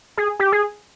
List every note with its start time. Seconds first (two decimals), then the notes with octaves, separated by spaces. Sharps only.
0.17 G#4
0.40 G4
0.52 G#4